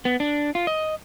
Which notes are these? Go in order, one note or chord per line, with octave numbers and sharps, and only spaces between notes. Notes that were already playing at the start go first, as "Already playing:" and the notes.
B3
D4
F4
D#5